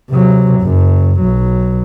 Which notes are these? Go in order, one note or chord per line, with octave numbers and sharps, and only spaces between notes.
C3 F#3
F#1 F#2
B1 F#3